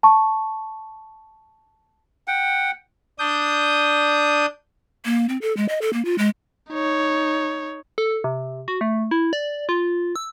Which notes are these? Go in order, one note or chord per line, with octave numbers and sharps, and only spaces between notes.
A5 C#6
F#5 G5
D4 D#6 G6
A#3
C4
A4
G#3
D#5
A4
A#3
F4
G#3
D#4 C#5
A4
C3
F#4
A3
E4
D5
F4
E6